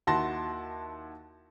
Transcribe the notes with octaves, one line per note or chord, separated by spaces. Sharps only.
D#2 E4 F#4 A5 C6 A#6